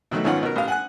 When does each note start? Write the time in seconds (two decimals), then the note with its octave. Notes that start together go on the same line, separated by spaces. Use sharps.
0.11 B2 D#3 F#3 A3
0.24 G#1 D#3 B3 C#4 F4 F#5
0.43 B2 A#4
0.56 A1 F5
0.68 F#5 G#5 F#6